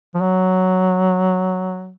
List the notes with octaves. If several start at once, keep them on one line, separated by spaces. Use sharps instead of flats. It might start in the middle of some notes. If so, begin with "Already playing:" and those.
F3
F#3